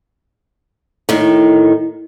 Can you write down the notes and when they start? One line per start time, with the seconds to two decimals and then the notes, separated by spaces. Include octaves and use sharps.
1.09 A2 D#3